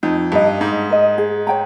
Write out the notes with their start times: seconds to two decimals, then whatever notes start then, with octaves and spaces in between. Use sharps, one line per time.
0.03 F2 D#4
0.32 G2 A#4 D#5
0.61 G#2 D#4
0.90 A#4 D#5
1.18 G#4
1.47 C#5 G5 A#5